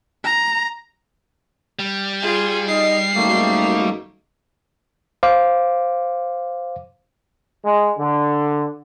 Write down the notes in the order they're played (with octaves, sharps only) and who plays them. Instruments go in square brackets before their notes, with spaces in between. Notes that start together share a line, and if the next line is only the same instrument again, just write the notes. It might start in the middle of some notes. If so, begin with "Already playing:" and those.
[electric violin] A#5
[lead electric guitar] G3
[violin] F4 G#4
[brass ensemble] D#4 D#5 [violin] C7
[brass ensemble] G#1 F#2 D#4 [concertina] A3 A#3
[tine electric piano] C5 F5 D6
[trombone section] G#3
D3